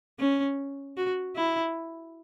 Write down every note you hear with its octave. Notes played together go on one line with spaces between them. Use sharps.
C#4
F#4
E4